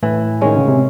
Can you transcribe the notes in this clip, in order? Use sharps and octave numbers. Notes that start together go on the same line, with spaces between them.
A2 E3
D#3 G#3 C#4
C#3
C3